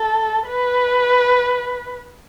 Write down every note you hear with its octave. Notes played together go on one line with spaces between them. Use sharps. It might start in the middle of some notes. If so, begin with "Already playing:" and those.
Already playing: A4
B4